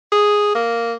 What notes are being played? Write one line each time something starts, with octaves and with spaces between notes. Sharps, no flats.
G#4
A#3